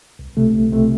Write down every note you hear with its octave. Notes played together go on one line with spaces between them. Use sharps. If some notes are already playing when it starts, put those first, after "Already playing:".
C2
C3 A3
C2
C3 A3